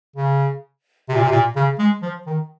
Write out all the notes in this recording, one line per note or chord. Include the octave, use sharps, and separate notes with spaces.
C#3
C3
A#2
C3
A#2
C#3
G#3
F3
D#3